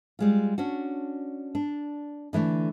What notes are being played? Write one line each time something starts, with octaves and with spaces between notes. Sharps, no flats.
G3 G#3 F4
C#4 D4 F#4
D4
D3 E3 F3 A3